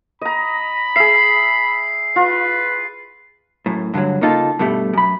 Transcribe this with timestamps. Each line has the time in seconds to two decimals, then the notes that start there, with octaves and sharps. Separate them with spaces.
0.21 D#5 A#5 B5
0.96 G#4 E5 C7
2.16 F4 B4
3.66 F#2 A2
3.94 G2 D3 F3 F#3
4.21 C#3 A#3 D#4 F4 A4
4.59 G2 B2 G3 A3
4.93 F#2 B5